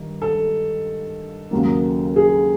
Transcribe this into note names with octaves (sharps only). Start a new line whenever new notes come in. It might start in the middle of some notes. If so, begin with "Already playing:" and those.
Already playing: G2 D#3
A4
D#2 C#3 F#3 A#3
G#4